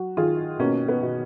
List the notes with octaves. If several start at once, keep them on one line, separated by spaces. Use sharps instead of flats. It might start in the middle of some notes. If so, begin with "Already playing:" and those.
Already playing: F#3 F#4
D#3 F4 G#4
B2 A#3 C#4
B3
B2